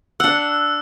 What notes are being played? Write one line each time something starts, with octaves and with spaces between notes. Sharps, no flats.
D4 F#5 E6